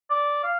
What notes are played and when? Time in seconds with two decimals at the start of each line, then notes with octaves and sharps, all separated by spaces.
0.10 D5
0.43 F5